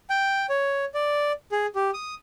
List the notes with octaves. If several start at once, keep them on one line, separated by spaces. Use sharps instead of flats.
G5
C#5
D5
G#4
G4
D#6